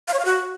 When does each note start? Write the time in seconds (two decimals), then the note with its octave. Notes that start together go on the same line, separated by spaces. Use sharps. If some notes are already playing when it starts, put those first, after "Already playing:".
0.08 F5
0.14 C#5
0.19 F5
0.25 F#4